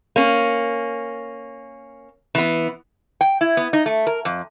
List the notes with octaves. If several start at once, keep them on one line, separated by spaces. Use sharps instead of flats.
A#3 C#4
E3 B3
G5
E4
B3
D#4
A3
A#4
F2